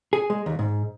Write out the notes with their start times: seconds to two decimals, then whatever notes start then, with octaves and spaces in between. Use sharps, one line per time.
0.13 G#4
0.30 G#3
0.46 D#2
0.59 G#2